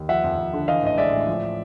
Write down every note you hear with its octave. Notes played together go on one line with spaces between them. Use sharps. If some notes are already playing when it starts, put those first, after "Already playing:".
Already playing: D#2
F3 E5 F#5
F2
F2
D3
E3 D#5 F5
A1 D#5
G#3 D5 E5
A2
F3